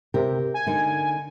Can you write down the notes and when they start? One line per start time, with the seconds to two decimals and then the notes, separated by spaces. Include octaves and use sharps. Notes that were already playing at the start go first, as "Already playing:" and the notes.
0.14 C3 G4 A#4
0.54 G#5
0.67 D3 A#3 D#4